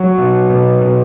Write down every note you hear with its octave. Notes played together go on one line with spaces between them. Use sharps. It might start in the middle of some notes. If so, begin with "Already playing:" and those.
Already playing: F#3
B2
B2
B2